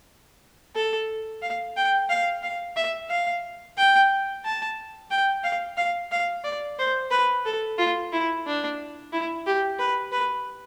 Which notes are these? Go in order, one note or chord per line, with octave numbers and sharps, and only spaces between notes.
A4
F5
G5
F5
F5
E5
F5
G5
A5
G5
F5
F5
F5
D5
C5
B4
A4
F4
E4
D4
E4
G4
B4
B4